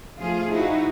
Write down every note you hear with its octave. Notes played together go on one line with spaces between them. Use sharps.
F3 A3 F4 G#4
D#4 E4 F#4